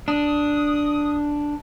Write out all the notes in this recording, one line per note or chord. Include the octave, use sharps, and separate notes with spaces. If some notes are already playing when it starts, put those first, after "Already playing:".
D4 D#6